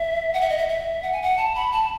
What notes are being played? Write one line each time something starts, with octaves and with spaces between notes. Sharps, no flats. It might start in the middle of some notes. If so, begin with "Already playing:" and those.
Already playing: E5
F#5
E5
D#5
E5
E5
F#5
G#5
F#5
A5
B5
A5